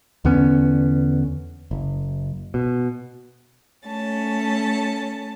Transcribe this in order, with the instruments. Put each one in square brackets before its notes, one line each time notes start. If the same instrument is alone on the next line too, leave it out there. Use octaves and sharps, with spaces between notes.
[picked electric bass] E2 D3 B3 C#4
F#1
B2
[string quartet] A3 C#4 A5